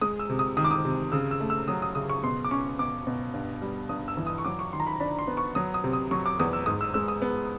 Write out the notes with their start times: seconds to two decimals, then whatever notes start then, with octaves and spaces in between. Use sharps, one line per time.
0.01 G#3 D#6
0.19 E6
0.29 C3
0.39 D#6
0.57 D#3 D#6
0.65 D6
0.71 D#6
0.85 C3
1.12 C#3 E6
1.31 E6
1.40 A3
1.50 E6
1.68 F#3 D#6
1.82 D#6
1.95 C#3 D#6
2.09 C#6
2.23 B2 C6
2.45 D6
2.51 C#4 C#6
2.79 B2 D6
3.07 B2
3.34 G2
3.62 G3
3.89 G2 D#6
4.08 E6
4.17 E3
4.27 D#6
4.38 C#6
4.45 F#3 D6
4.59 C#6
4.73 D#3 C6
4.80 A#5
4.87 B5
5.00 D4 B5
5.19 C6
5.27 B3
5.37 C#6
5.55 F#3 D#6
5.74 D#6
5.84 C3
5.93 D#6
6.11 F#3 C#6
6.26 D6
6.39 E2 D#6
6.53 E6
6.66 G#2 D#6
6.81 E6
6.94 G#3 E6
7.08 D#6
7.22 B3